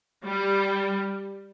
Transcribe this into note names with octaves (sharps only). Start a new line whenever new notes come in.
G3